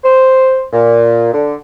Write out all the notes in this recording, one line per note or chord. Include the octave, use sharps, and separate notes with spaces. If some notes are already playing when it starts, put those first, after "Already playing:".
C5
A#2
D3